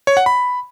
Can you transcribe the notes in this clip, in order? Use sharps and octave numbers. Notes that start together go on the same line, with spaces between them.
C#5
F#5
B5